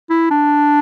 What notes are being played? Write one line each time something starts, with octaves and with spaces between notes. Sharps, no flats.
E4
D4